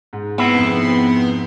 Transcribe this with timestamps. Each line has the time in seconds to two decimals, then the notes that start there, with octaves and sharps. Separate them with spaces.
0.13 G#2
0.38 B3 C4 E4
0.54 F2 G#2